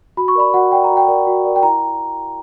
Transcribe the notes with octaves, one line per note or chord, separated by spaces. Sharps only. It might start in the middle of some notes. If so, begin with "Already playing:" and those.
F#4 B5
C#6
A#4 D5 B5
F#4 F#5
A#4 D5 G5
A#5
F#4
G5
A#4 D5
F#4
A#4 D5
G5
E4 A#5